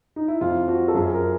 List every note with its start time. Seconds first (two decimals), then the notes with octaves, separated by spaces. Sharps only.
0.16 D#4
0.28 E4
0.41 F2 F4
0.68 F3 F#4
0.88 A4
0.94 F#2 G#4
1.12 A#4